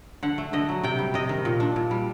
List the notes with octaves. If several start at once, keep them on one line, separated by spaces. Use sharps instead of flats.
D3 F#5
A3
D3 D#5
F#3
C3 G5
G3
C3 D#5
D#3
A#2
D4
A#2
G3